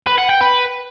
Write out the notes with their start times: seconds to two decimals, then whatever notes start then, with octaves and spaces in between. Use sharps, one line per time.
0.07 B4
0.18 F#5
0.30 G5
0.41 B4